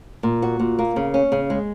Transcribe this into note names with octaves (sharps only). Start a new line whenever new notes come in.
A#2
F#4
A#2
A#3
C#3
C#4
C#3
G#3